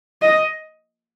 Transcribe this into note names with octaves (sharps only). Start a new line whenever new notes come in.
D#5